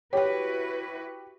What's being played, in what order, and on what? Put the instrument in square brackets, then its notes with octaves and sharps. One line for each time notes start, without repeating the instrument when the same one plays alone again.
[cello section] E4 F#4 B4 [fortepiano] G4 [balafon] C#5 G5